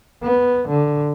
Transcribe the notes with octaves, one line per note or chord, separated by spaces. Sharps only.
B3
D3